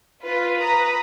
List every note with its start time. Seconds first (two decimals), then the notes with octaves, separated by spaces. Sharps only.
0.23 F4 B4
0.59 B4 A#5 D#6